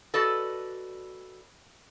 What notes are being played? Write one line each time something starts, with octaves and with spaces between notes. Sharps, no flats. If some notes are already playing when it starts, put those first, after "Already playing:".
F#4 A4 B4 D5 D#5